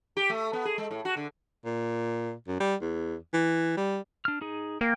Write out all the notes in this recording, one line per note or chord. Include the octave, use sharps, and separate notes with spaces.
G4
A3
B3
G#4
G#3
A2
F#4
D3
A#2
F#2
G3
E2
E3
G3
D4 F6
D#4 G#4
A#3 G5